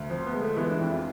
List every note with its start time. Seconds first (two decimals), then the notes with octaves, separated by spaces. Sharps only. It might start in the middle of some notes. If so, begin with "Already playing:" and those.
Already playing: D2
0.10 F3 C4
0.26 B3
0.33 G#3
0.41 A3
0.57 E3 B3
0.69 D4
0.80 F2 E4
0.92 F4